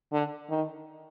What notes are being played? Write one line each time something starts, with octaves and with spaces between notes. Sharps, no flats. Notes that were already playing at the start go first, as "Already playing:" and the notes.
D3
D#3